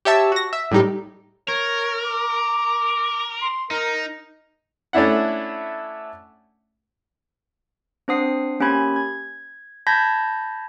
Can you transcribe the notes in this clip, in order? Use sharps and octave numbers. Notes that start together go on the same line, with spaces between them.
G4 C#5 E5 A5 E6
F#4 A#6
E5
A2 G3 D#4 G4
A#4 C#5
D6
C6
D#4 A#4
A3 C#4 D4 E4 F#5
C4 D4 C5 F#5 D#6 C7
A#3 C#4 G4 G#5 B5 G#6
G#6
A5 B5 G6 G#6 A#6 B6